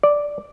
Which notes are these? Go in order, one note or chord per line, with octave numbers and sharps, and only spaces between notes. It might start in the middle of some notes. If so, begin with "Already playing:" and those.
D5